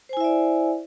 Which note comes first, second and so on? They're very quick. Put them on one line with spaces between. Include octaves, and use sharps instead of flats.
C5 G#5 E4 E5 D5